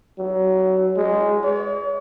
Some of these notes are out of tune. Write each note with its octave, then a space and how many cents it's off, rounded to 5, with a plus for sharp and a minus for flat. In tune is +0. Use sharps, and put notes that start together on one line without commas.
F#3 +25
G#3 -5
C#5 +45